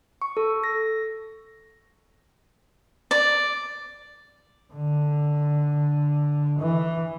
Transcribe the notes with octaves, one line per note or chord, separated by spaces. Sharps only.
C#6
A4
A#6
D5
D3
E3